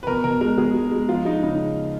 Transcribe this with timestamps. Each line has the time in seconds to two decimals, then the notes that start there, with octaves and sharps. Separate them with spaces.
0.03 B4
0.07 B2 A#4
0.24 B2 A#4
0.41 G#3 A#4
0.58 B2 G#4
0.75 G#3
0.92 G#3
1.08 F3 F4
1.25 G#3 D#4
1.43 C#3 D#4